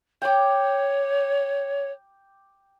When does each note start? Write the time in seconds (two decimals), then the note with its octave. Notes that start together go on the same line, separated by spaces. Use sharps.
0.22 C#5 G5 D6